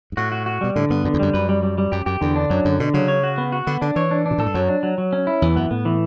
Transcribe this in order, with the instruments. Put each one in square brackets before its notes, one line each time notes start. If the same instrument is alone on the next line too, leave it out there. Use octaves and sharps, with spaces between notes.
[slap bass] G2
[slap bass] A2 [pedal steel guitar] F#4
[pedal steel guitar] F#4
F#4
[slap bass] B2 [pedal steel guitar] G3
[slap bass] A2 [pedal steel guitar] D3
[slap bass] G2 [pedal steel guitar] B3
[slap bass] F#2 [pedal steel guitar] D3
[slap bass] E2
[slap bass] F#2 [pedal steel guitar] G3
[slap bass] F#2 [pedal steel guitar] B4
[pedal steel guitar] G3
G3
G3
[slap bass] F#2 [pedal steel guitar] G4
[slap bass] F#2 [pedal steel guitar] G4
[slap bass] E2 [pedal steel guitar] D3
[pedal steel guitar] D4
[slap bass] F#2 [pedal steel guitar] F#3
[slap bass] F#2 [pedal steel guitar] D3
[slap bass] B2 [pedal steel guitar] D3
[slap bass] C#3 [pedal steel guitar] F#3
[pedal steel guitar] C#5
F#4
B3
F#4
[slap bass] D3 [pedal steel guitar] B3
[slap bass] D3 [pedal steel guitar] D4
[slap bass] E3 [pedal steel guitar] C#5
[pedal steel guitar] D4
D4
[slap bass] B2
[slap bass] A2 [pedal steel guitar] A4
[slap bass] G2
[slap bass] F#2 [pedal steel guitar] F#3
[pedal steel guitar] D4
F#3
F#3
C#4
E4
[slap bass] E2 [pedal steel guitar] E3
[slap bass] F#2 [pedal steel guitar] B3
[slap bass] A2 [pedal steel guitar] B3
[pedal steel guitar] E3